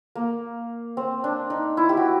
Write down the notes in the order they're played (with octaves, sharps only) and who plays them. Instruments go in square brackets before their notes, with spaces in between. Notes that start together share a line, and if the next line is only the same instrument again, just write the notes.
[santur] A#3
C4
D4
D#4
E4
G4
F#4